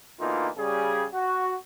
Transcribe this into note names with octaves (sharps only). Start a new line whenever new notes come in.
B2 D3 E3 A#3 D#4 F4
C#3 G3 G#4
F#4